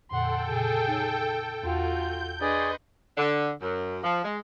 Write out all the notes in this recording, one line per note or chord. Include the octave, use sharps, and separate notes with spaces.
F2 A#2 D3 A4 F#5 G5 C6
A#2 C#3 G#4
D#4 C#5
E2 F4 F#4 G6
D4 G#4 B4 D5 D#5 C6 C#6
D3
F#2
F3
G#3